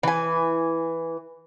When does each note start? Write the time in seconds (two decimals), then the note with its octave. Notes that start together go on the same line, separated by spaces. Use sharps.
0.03 E3 G#5